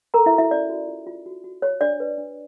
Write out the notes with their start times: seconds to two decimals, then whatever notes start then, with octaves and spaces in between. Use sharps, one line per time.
0.14 A4 A#4 A#5
0.26 E4 E5
0.33 F#4
0.38 E4 E5
0.51 C#4 D5
0.69 F#4
0.88 F4
1.07 F4
1.26 F#4
1.44 F#4
1.62 C#5
1.81 D4 D5
2.00 B4
2.18 D4